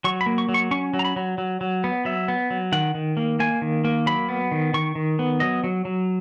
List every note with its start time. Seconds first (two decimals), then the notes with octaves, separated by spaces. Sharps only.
0.04 F#3 C#6
0.21 B5
0.26 A#3
0.38 C#6
0.49 F#3
0.54 C#6
0.71 C#4 C#6
0.94 F#3
0.99 A#5
1.05 B5
1.16 F#3
1.38 F#3
1.61 F#3
1.84 B3
2.05 F#3 E5
2.28 B3
2.50 F#3
2.72 D#3 F#5
2.95 D#3
3.17 A#3
3.40 A#3 G#5
3.62 D#3
3.85 A#3
4.06 F#3 B5
4.29 B3
4.51 D#3
4.74 D#3 C#6
4.95 D#3
5.19 B3
5.40 F#3 D#5
5.64 F#3
5.85 F#3